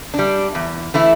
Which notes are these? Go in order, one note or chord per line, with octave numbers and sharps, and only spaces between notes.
G3 D4
E2
E3 A3 E4